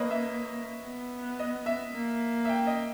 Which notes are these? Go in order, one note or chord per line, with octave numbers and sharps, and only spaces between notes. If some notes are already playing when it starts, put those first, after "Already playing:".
Already playing: A#3 B4 C#5 D#5
E5
B3
D#5
E5
A#3
E5
G5
D#5